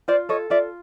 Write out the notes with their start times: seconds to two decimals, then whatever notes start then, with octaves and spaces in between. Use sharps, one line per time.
0.08 F4 C5 D5
0.29 A4 C#5 D#5
0.50 F4 D5 E5